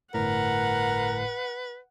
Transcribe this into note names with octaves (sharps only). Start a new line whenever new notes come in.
G1 A2 A#4 B4 F#5